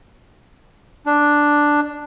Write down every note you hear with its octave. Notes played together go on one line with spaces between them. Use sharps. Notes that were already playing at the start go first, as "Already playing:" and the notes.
D4